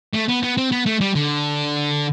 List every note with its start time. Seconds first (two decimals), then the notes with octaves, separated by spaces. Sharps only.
0.14 A3
0.29 B3
0.43 B3
0.57 C4
0.72 B3
0.86 A3
1.01 G3
1.15 D3